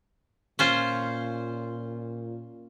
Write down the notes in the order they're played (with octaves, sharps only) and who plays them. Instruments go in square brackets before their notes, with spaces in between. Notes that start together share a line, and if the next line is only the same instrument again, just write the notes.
[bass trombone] A#2 [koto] C#4 F4 C5